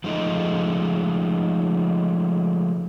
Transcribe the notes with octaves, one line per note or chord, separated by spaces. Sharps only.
F3 G#3 A3 D#4